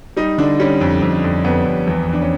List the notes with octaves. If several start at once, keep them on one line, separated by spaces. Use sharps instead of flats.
G3 D#4
D3 D4
G3 C#4
F2
F2
F2
F2 B3
F2
E2
E2
D4
C#4